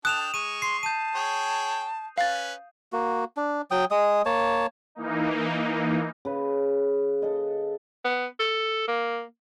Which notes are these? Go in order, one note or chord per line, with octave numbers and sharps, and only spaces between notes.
D4 A4 G5 D#6 F#6 E7 F7
G#3 C#6 D#7
C6 C7
A5 G6 D#7
G#4 C#5 G5
C#4 B4 F5 A6
A#3 F#4
D4
F#3 G5 D#6
G#3 D#6
A#3 C#5 A5
E3 A#3 D#4
C#3 B4
A4 D#5
B3
A4
A#3